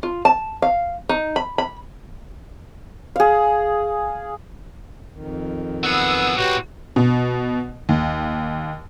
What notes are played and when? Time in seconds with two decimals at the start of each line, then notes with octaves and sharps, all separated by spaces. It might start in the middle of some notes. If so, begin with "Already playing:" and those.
0.03 F4
0.25 A5
0.62 F5
1.09 D#4
1.36 B5
1.58 B5
3.16 G#4 F5
5.13 F2 D#3
5.84 F#3 B3 G#4 F#5 E6
6.36 A2 C4 F#4 G4 B4 C#5
6.96 B2
7.89 D#2